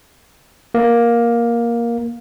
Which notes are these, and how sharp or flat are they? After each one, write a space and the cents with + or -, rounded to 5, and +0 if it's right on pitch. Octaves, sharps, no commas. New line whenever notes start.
A#3 +10